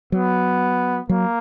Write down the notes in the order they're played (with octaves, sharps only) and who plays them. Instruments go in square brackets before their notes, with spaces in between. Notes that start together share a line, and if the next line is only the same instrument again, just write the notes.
[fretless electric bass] F#3 [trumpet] B3
[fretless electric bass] F#3 [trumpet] A#3